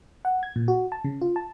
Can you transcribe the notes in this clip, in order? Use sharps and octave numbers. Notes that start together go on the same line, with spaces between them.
F#5
G#6
A#2
F#4
A5
C#3
F4
A5